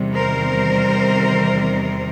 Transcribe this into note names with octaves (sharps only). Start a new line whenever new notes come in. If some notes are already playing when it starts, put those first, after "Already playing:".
Already playing: E2 C3 D#3 G3
A#4 C5